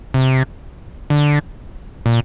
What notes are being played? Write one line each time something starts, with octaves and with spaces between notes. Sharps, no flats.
C3
D3
A#2